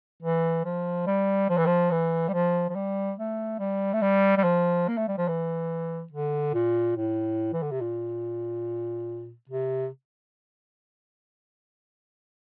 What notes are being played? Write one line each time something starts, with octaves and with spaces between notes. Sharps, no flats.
E3
F3
G3
F3
E3
F3
E3
G3
F3
F3
G3
A3
G3
A3
G3
G3
F3
A#3
A3
G3
F3
E3
D3
A#2
A2
E3
D3
C3
A#2
C3